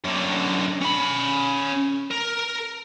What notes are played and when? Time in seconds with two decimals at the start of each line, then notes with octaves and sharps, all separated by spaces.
0.05 F#2 D3
0.82 C#4 B5
2.11 A#4